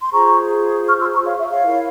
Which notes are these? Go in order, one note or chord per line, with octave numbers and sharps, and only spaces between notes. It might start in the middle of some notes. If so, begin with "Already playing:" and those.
C6
F4 G#4 C5 A#5 C#6
C#6 F6
C6 E6
A#5 C#6
C#5 F5
E5
C#5 F5
E4 A#4 C#5